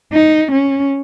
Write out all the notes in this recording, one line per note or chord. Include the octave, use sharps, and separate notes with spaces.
D#4
C#4